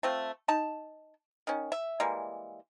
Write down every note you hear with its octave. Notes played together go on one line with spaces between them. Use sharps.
A3 C4 F4
D#4 A5
D#3 C#4
E5
E3 G3 G#3 A#3